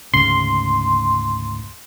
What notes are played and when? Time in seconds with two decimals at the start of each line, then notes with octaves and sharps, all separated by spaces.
0.14 D2 G#2 C#3 C6